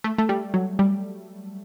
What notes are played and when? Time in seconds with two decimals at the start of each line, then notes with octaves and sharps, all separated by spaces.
0.04 A3
0.18 A3
0.29 G3
0.54 F#3
0.79 G3